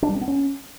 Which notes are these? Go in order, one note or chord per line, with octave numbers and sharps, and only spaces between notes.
D4
G3
C4
B3
C#4